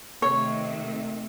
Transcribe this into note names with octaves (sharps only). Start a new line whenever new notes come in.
C3 D#3 A3 C#5